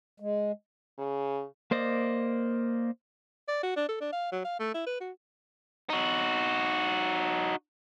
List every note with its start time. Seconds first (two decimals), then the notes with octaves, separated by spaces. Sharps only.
0.20 G#3
0.98 C#3
1.71 A#3 C5 D5 D#5
3.48 D5
3.63 F#4
3.77 D4
3.89 A4
4.01 D4
4.13 F5
4.32 F#3
4.45 F5
4.60 A3
4.74 E4
4.87 B4
5.01 F#4
5.90 D#4 F#4